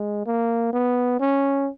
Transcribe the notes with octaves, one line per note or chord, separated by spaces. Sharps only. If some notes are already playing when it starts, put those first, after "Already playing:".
Already playing: G#3
A#3
B3
C#4